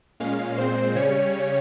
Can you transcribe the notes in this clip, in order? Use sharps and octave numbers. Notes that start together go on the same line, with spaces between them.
A#2 G#3 C#4 F5
A#2 G#3 C4 C5
C#3 G3 C#4 C#5